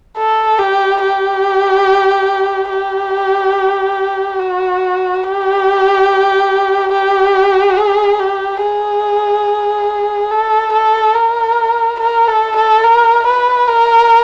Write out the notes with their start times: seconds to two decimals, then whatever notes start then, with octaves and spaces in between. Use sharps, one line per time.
0.17 A4
0.58 G4
1.02 G4
2.70 G4
4.40 F#4
5.23 G4
6.92 G4
7.77 G#4
8.20 G4
8.62 G#4
10.31 A4
10.73 A4
11.15 A#4
12.00 A#4
12.28 A4
12.56 A4
12.84 A#4
13.26 B4
13.68 A#4